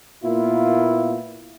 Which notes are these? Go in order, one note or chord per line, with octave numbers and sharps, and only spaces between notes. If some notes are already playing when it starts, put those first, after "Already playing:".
A#2 A#3 B3 E4 F4